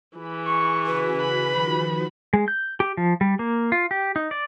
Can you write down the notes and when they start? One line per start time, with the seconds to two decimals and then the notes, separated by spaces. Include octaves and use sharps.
0.17 E3 G#4 B5
0.47 C#6
0.86 C#3 F#4 B4 B6
1.21 B5
1.49 D#3 F3 F#4
2.34 G#3
2.48 G6
2.80 G4
2.97 F3
3.21 G3
3.39 A#3
3.72 F4
3.91 G4
4.16 D#4
4.31 D5